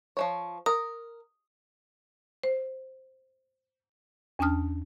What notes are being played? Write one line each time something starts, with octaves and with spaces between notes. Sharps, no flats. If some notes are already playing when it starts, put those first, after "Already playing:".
F3 A3 C#5
A#4 D#6
C5
E2 C#4 D4 A5 D#6 F6